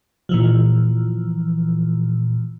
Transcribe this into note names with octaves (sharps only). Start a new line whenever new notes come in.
A#2 E3 F3